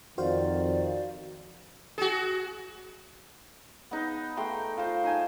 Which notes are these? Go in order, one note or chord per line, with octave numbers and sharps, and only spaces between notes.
F2 D#3 F#4 C5 D5 F5
F#4 G#4
B3 D#4 B4
A3 G5 A#5 C6
F4 C5
D#4 G#5 A5